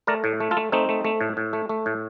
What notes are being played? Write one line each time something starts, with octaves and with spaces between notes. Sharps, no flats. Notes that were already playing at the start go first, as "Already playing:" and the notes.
A3 A#4 D5
A2
A3
F4 A4
A3
A3 C4 D#4
A3
A3
A2
A2
A3
A3
A2